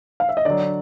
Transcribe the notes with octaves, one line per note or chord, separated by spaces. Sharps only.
F5
E5
D#5
D3 F#3 D5